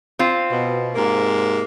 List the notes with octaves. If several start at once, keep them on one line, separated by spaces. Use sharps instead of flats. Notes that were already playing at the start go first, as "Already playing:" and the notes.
C4 F4
B2
G#2 C3 A#3